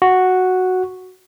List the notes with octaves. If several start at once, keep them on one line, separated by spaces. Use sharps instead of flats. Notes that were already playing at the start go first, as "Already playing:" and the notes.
F#4